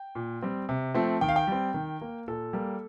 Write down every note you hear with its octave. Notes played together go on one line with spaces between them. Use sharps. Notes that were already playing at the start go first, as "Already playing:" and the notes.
Already playing: G5
A#2
G3 C4
C3
F3 A3 C4
D#3 G5
F5
G5
G3 C4
D#3
A#3
A#2 A4
G3 A#3